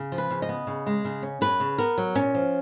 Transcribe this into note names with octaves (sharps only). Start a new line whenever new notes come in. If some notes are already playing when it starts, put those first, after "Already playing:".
Already playing: C#3
F3
B4
C#3
D#5
B3
C#3
G#3
C#3
C#4
F#2 B4
C#3
B3 A#4
F#3
A#2 C#4
F3